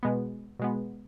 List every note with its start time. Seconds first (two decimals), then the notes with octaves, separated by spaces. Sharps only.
0.03 B2 G#3 B3
0.59 B2 G#3 B3